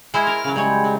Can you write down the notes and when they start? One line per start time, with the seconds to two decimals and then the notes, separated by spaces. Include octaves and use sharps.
0.14 G#3 E4 C5 F6
0.27 A#4
0.44 C#3 F#3
0.56 C#3 G3 G#3 C#5
0.84 F#3